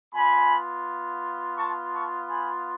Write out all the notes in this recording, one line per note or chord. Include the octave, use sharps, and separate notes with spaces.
B3 F4 G#5 B5
A5 C#6
A5 C#6
G#5 B5